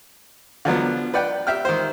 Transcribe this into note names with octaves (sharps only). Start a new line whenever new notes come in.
D3 F3 F#3 B3
B4 D5 F#5 G5
G4 E5 G5 F6
D#3 C5